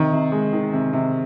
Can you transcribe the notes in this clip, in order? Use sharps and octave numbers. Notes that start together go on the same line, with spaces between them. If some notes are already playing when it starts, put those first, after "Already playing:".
Already playing: C3 D#3
C3
G#3
D#3
C3
C3